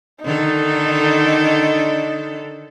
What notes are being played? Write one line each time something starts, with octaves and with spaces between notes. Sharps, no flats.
D3 D#3 D#4 A4